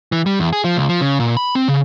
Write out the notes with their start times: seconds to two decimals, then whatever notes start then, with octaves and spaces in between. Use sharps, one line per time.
0.12 E3
0.26 G3
0.40 E2
0.53 G#4
0.64 F3
0.77 C#2
0.89 F3
1.01 C#3
1.20 A#2
1.37 B5
1.55 C4
1.68 C#3